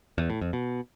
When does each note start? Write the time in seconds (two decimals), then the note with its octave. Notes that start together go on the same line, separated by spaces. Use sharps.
0.18 E2
0.30 A2
0.41 F2
0.53 B2